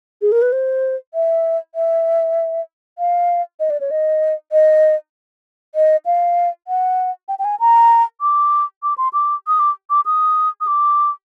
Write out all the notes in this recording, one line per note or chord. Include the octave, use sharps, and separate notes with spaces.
G#4
A#4
B4
C5
E5
E5
F5
D#5
D5
C#5
D#5
D#5
D#5
F5
F#5
G5
G5
G#5
A#5
D6
D6
C6
D6
D#6
D6
D6
D#6
D#6
D6